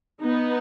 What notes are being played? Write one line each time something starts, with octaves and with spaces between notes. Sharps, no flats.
B3 D#4